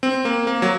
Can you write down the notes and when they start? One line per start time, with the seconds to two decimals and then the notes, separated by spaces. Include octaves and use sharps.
0.03 C4
0.25 A#3
0.47 A#3
0.62 F#3